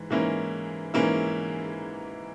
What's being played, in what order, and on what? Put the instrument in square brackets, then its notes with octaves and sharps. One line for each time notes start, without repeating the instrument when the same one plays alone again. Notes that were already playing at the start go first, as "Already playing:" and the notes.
Already playing: [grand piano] G#2 E3
G#2 E3 A#3 C#4 E4
G#2 E3 A#3 C#4 E4